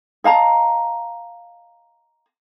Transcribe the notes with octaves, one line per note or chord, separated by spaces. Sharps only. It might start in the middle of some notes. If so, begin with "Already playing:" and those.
D#5 F5 A5 A#5